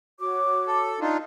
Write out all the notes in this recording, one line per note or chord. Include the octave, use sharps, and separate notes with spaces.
F#4 C#5 D6
A4
D4 D#4 F4